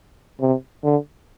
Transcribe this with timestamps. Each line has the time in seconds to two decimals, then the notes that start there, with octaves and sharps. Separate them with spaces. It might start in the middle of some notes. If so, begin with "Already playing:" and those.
0.41 C3
0.84 D3